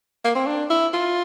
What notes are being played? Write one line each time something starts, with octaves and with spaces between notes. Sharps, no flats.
A#3
C4
D4
E4
F4